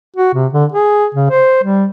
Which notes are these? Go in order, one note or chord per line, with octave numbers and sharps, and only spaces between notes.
F#4
C3
D3
G#4
C#3
C5
G3